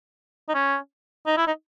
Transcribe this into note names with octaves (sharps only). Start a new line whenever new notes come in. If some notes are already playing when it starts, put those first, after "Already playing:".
D#4
C#4
D#4
E4
D#4